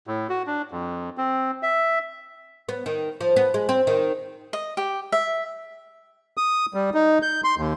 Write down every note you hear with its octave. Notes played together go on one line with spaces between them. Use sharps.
A2
F#4
D4
F2
C4
E5
B3
D#3
F3
B3
G#3
C4
D#3
D#5
G4
E5
D#6
G3
D#4
G6
C6
D#2